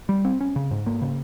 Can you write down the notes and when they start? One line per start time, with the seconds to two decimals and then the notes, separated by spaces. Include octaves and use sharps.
0.09 G3
0.25 C4
0.41 C#4
0.56 C#3
0.71 G#2
0.86 A#3
1.02 C#3